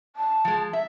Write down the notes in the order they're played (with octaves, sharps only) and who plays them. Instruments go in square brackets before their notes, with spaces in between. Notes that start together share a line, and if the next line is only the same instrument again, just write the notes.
[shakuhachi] A5
[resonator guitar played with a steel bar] F3 G#3
E5